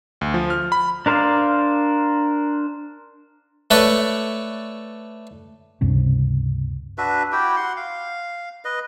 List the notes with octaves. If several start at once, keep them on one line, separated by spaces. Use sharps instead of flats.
D2
F3
F6
B5
D4 A#4 C5 D5 F5
A3 B4 C#5 D5
C#2 G2 C3
D4 F#4 B4 E5
E4 F#4 G4 G5
F#5 C6
F5
B4 D#5